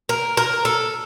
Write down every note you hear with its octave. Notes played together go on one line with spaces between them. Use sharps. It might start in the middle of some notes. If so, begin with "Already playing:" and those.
A#4
A#4
A4